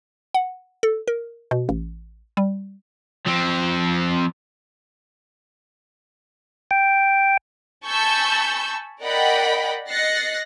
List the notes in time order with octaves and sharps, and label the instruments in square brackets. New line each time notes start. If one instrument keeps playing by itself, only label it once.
[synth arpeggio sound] F#5
A4
A#4
B2
A1
G3
[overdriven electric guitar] F3 C4
[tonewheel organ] G5
[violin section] G#5 A5 B5 C#6 E6 G6
A#4 D5 D#5 F#5 G5 B5
D#5 F#6 A6 A#6 C7 C#7